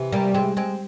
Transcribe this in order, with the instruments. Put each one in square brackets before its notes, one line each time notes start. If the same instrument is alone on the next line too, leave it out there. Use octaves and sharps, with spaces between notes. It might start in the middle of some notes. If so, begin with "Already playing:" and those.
Already playing: [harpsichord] C3 E3
[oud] G3 A#3
G#3 C4
G#3 C4